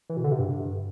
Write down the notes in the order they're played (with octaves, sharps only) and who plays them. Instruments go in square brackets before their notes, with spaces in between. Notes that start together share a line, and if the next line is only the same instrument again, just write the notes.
[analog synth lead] E3
B2
D3
C3
G2